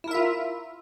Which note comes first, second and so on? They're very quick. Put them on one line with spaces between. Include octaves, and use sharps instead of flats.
E4 A#4 E5 F4